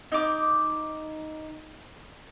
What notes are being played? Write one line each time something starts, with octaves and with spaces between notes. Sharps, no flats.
D#4 D6